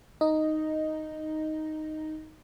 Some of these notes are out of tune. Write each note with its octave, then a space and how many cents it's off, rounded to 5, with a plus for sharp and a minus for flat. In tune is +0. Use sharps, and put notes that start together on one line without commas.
D#4 +0 D#5 +0